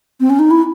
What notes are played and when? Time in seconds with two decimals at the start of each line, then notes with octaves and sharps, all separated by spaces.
0.20 C4
0.29 C#4
0.39 D#4
0.50 E4